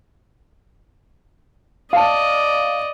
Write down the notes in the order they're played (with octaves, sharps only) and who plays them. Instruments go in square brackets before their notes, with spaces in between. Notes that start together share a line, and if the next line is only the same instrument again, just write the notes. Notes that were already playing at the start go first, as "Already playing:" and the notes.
[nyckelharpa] D5 D#5 [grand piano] F5 A5